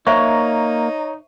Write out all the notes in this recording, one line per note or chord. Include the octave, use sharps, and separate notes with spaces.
A#3 D#4 C5 C#5 E5 A#5 C#6